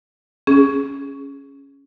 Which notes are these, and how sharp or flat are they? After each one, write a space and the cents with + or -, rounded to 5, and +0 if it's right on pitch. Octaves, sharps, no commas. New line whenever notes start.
C#4 +0 G#4 +0